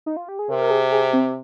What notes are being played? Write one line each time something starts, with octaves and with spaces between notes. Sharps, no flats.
D#4
F4
G4
G#4
C3 A#4
A#4
G#4
G#4
C4